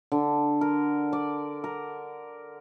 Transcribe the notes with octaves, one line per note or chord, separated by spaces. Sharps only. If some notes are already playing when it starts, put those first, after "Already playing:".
D3
A#4
D5
A#4